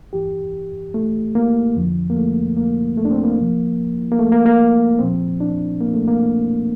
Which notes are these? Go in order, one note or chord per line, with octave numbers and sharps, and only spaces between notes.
G2 E3 G4
A3
A#3
F2 D3 F3
A#3
A3
A#3
A3
D4
C4
A#3
D2 C3 F3
A#3
A3
A#3
A#3
C2 A#2 F3 C4
D4
A#3
A3
A#3